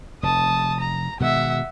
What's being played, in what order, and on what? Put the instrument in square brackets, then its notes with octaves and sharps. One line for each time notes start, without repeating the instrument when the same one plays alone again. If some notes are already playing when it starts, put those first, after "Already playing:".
[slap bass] F1 [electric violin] A5 D#6
[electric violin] A#5
[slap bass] B2 D#3 G#3 [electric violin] E5 F#5